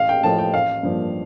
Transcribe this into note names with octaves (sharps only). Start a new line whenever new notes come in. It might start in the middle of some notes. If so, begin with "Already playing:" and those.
Already playing: A1 F5
G5
A2 F3 A5
G5
A1 F5
G2 F3 A#3